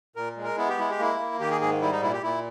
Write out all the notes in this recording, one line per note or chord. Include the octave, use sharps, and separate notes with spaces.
A#2 A#4
G#3
A#4
B3 E4
G4
G#3 E4
G4
A#3 E4
A#3
D#3 G4
G#4
G#2 G#4
G3 E4
D#4
A#2 E4
G4
A#2 E4